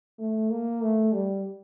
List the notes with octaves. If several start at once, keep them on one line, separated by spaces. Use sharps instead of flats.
A3
A#3
A3
G3